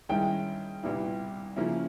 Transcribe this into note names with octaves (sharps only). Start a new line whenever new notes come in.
G2 D#3 G#3 C#4 E4 G5
C2 A#2 G3 B3 E4
C#3 F3 A#3 C#4 E4